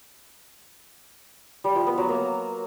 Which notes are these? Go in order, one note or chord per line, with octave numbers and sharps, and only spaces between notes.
G3
F3
B3
F#3
A#3